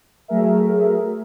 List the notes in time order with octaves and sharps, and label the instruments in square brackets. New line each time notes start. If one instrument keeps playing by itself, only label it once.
[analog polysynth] F#3 A3 G#4 A#4 E5